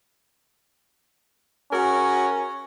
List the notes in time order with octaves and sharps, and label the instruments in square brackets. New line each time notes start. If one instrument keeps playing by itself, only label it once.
[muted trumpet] C#4 [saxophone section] F#4 G#4 A#4